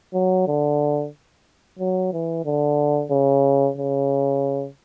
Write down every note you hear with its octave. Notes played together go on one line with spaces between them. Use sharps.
F#3
D3
F#3
E3
D3
C#3
C#3